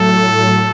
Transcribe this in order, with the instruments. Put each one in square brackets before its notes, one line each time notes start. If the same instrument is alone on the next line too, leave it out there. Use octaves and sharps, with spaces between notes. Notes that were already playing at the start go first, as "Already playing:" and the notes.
Already playing: [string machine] A2 F#3 A3 [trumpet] A4